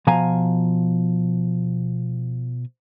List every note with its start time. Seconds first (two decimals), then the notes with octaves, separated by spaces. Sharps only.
0.07 B2 F3 F5 G#5 A#5